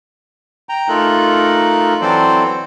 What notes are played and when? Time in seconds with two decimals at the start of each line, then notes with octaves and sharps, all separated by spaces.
0.69 G5 A#5
0.89 A3 D#4 F4 A4 A#4 F#6
2.02 E3 F#3 C4 A4 C5 D5